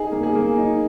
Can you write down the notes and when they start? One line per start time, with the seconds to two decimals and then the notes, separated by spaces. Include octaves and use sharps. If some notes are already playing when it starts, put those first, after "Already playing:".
Already playing: D#4 G#4
0.12 A#3
0.23 G#4
0.35 A#3
0.58 D#4